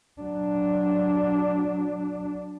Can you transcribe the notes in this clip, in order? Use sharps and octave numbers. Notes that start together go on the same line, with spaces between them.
F#3 D4